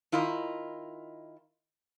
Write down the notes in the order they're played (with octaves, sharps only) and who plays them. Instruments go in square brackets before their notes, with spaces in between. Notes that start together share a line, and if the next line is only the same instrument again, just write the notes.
[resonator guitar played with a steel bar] D#3 E4 F4 A#4 D#5